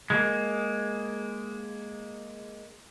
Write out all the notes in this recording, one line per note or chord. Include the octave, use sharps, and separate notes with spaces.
G#3 A#3